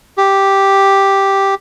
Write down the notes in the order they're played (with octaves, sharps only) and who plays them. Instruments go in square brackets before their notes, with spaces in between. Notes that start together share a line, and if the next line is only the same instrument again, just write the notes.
[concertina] G4